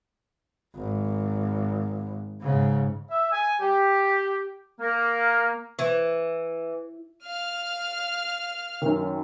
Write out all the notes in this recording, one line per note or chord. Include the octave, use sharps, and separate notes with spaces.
G#1
G#2 C#3
E5
G#5
G4
A#3
E3
F5 F6
F#2 D#3